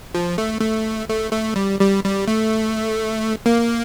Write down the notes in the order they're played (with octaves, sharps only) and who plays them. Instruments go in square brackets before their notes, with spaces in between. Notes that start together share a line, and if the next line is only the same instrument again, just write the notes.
[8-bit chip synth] F3
A3
A3
A3
A3
G3
G3
G3
A3
A#3